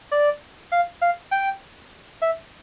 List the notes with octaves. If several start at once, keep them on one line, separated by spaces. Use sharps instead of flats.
D5
F5
F5
G5
E5